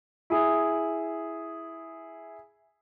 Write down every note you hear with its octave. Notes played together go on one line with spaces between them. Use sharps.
E4 G#4